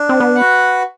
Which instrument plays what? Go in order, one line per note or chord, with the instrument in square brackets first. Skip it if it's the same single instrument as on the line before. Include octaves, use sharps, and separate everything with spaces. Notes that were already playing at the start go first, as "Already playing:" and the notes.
Already playing: [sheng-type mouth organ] D4
[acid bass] C4
B3
[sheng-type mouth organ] F#4 B4 F#5